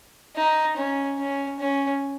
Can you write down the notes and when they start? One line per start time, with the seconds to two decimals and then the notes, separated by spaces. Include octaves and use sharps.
0.36 D#4
0.77 C#4
1.19 C#4
1.60 C#4